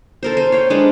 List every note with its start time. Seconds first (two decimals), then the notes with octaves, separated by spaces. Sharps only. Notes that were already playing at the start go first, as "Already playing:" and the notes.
0.23 A4 A#4 C5
0.37 C5 G#5
0.52 C#5 F5 G5
0.70 G#3 D4 B4 C5